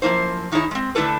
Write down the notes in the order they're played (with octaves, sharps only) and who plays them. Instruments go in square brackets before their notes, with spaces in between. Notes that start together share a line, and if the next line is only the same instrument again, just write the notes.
[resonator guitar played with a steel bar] F#2 F3 A#3 E4 C5
D#3 D#4 E4 G#4 C#5
G#3 C4
D3 A3 D4 E4 A4 B4